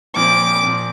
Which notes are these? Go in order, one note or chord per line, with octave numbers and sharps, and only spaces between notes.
A#2 F3 C4 D6
A#2 F3 C4